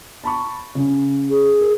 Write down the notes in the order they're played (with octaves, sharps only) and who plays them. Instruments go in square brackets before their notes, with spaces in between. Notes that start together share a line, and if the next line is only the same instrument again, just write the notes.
[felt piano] A5 B5 C#6
C#3 C#4
[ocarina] G#4
[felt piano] A#4